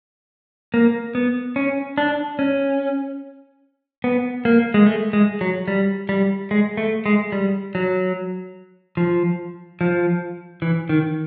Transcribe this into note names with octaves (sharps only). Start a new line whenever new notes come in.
A#3
B3
C#4
D4
C#4
B3
A#3
G#3
A3
G#3
F#3
G3
G3
G#3
A3
G#3
G3
F#3
F3
F3
E3
D#3